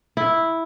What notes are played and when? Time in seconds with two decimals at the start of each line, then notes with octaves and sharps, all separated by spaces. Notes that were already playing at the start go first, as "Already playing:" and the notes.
0.17 E4